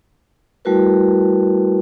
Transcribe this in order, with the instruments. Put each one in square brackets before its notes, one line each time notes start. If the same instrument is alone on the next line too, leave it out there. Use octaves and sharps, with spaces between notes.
[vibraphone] G3 A3 E4 F#4 A#4 B4